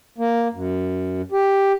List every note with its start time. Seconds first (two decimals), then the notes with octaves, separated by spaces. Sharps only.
0.18 A#3
0.54 F#2
1.32 G4